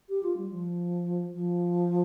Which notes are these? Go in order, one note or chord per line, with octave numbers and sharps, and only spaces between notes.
G4
F4
G3
F3
F3